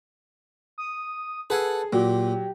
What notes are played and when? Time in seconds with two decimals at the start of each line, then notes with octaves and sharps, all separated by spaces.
0.78 D#6
1.50 G#4 A4 B4 F#5 G#5
1.93 A#2 F#3 G4